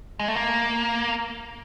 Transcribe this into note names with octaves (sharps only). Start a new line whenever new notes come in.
G#3
A3
A#3